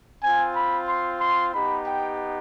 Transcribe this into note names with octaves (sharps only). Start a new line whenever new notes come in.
C4 F4 G#5
B5
C6
C6
B3 D#4 G4 B5
G5